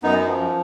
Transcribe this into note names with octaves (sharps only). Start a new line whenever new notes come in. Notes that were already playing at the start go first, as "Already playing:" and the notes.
F#2 B3 D#4
F3